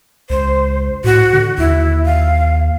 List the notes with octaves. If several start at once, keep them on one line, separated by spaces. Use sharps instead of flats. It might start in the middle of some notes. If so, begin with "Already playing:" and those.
C#2 C5
A2 F#4
D3
D#2 E4
F5